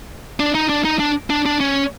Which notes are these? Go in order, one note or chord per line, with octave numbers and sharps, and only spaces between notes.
D4
D#4
D4
D#4
D4
D4
D4
C#4